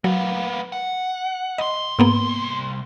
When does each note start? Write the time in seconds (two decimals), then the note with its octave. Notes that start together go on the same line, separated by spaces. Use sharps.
0.04 F#3 A#3 B3
0.72 F#5
1.58 C2 D#5 C6
1.99 G#2 A#3 B3